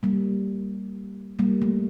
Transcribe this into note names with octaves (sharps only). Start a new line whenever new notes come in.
G3 A#3
G3 A#3
A3